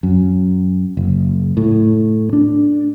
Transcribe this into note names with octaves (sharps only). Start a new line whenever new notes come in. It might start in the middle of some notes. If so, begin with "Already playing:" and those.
F#2
F#1
A2
D4